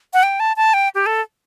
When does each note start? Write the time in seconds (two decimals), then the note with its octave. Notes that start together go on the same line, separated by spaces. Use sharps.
0.13 F#5
0.23 G5
0.40 A5
0.56 A5
0.74 G5
0.95 G4
1.06 A4